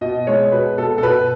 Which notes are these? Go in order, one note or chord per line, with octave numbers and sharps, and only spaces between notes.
B2 D#5
G#3 C#5
B2 B4
B2 A4
A4
B2 B4